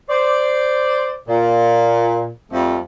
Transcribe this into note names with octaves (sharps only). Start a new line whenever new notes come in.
C5 D5
A#2
F2 F3 G3 A3